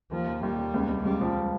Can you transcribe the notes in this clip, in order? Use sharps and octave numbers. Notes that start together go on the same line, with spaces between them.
D#2 F3
D#2
D#2 G3
D#2
C#2
C#2
C#2 G3
F3